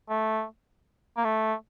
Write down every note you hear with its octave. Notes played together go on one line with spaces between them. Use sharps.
A3
A#3
A3